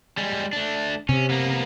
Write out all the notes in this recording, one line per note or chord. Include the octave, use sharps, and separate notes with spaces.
G3 G#3
A3 D4
C3 C#4
A#3 B3